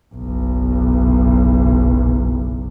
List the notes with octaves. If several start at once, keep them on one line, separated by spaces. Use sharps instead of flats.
F#1 B1